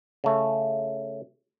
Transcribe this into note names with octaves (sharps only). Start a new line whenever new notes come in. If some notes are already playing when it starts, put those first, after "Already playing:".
C#3 A3